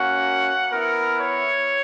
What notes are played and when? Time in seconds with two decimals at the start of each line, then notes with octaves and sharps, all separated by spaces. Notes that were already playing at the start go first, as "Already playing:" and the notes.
Already playing: A#3 C#4 F#4 F#5
0.72 B3 E4 A#4
1.19 C#5